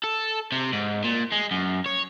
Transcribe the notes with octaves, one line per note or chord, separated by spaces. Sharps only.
A4
C3
G#2
A#2
G#3
F#2
C#5